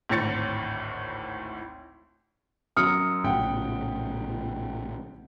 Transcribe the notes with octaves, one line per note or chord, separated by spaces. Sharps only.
G#1 D2 A2 C#5 A6 C#7
F#2 F#3 D#6 F6 C#7
A#1 A2 C#3 F#5 G5